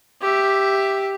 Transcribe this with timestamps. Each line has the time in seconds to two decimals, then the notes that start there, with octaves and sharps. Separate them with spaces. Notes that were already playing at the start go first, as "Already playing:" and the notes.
0.21 G4 E5